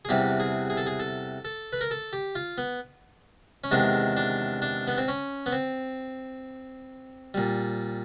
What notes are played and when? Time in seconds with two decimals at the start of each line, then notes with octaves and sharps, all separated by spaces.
0.05 G#4
0.09 E2 C3 E3 G3 G4
0.40 G#4
0.70 G#4
0.77 A4
0.86 G#4
1.00 A4
1.45 A4
1.73 B4
1.81 A#4
1.91 A4
2.13 G4
2.35 F4
2.58 B3
3.64 C#4
3.71 E2 C3 D#3 G#3 D4
4.17 D4
4.62 D4
4.87 B3
4.98 C4
5.08 C#4
5.46 B3
5.52 C4
7.34 A#2 G3